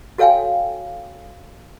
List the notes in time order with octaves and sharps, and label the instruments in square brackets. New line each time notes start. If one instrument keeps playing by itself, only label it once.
[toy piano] F#4 A4 C#5 F5 G5 G#5